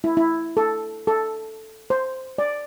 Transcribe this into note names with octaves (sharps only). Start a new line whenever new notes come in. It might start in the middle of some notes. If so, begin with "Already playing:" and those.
E4
E4
A4
A4
C5
D5